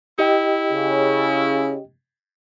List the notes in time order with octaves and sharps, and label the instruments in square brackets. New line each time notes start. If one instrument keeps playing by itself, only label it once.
[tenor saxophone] E4 [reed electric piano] G4 D#5 G5
[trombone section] C#3